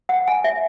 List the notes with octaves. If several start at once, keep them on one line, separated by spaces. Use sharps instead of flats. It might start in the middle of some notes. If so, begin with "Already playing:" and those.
F#5
G#5
E5